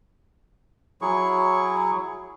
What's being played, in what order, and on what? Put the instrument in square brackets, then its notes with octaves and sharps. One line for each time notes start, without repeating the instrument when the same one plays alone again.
[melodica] F#3 E4 G#4 C#6